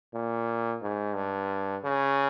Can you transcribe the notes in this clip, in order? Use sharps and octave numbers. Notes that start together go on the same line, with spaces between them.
A#2
G#2
G2
C#3